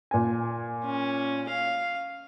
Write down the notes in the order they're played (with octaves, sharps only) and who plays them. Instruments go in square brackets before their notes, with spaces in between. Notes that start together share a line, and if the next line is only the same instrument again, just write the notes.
[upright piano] A#2 G#5
[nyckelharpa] C#4
F5